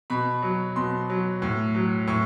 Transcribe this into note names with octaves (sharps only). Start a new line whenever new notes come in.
B2 B5
F#3
B2 C6
F#3
A2
F#3
A2 C#6